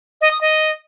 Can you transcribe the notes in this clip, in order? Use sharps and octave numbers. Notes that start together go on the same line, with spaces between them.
D#5
D#6
D#5